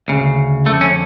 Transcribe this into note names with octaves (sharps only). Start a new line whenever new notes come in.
D2 C#3
F2 D3 A3
C#4